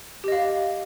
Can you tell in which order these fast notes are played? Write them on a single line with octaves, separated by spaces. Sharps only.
G4 D#5 F5